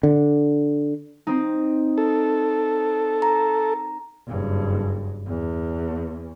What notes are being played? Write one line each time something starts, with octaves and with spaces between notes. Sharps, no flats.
D3
C4 D#4
A4
A#5
F#1 G2
E2